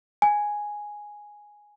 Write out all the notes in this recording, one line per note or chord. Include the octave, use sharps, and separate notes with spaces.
G#5